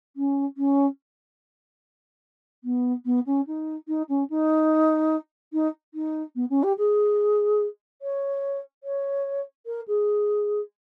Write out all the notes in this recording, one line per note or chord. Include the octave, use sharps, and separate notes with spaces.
C#4
C#4
B3
B3
C#4
D#4
D#4
C#4
D#4
D#4
D#4
B3
C#4
G4
G#4
C#5
C#5
A#4
G#4